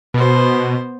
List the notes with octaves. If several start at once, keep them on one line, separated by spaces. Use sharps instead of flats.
B2 B3 C5